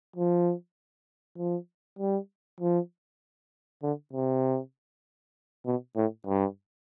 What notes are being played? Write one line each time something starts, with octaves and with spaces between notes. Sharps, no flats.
F3
F3
G3
F3
D3
C3
B2
A2
G2